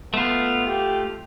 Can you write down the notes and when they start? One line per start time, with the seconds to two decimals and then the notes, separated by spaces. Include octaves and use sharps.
0.14 A3 B3 F4
0.67 G4